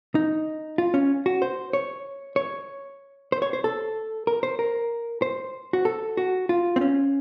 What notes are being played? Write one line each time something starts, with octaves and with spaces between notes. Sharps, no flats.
D#4
F4
C#4
F#4
C5
C#5
C#5
C5
C#5
C5
A4
A#4
C5
A#4
C5
F#4
A4
F#4
F4
C4
C#4